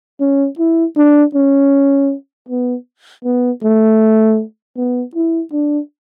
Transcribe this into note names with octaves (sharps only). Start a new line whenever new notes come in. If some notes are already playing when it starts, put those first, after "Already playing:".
C#4
E4
D4
C#4
B3
B3
A3
B3
E4
D4